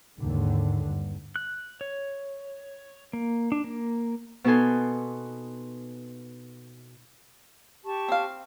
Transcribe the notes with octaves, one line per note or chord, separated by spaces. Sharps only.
D#2 G#2 D3
G2
F#6
C#5
A#3
D4
A#3
B2 B3 D#4 A4 G#5 C6
G4 A5 C#6
C4 F5